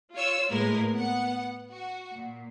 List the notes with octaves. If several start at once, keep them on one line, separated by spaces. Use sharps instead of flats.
F4 C#5 E6
A2 G#3 A#3 A#4 B4
B3 F#5
F#4
A#2